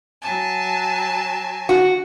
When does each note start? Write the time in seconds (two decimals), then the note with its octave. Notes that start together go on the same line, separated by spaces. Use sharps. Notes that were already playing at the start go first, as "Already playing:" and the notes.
0.21 F#3 G#5 A5
1.69 F#4